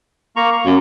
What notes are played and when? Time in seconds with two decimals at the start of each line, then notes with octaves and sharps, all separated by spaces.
0.36 A#3 A#5 C#6
0.52 C#6
0.66 F#2